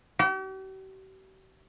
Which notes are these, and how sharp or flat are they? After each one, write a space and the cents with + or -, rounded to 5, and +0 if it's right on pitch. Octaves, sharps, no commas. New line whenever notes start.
G4 -45